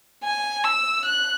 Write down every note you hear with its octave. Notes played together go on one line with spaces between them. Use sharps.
G#5
E6
F#6